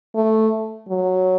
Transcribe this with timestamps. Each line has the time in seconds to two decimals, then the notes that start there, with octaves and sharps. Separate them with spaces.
0.15 A3
0.89 F#3